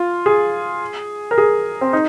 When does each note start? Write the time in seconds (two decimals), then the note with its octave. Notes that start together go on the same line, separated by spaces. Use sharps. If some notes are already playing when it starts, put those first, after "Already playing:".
Already playing: F4
0.26 G#4
1.31 A#4
1.38 G#4
1.81 C4
1.93 D#4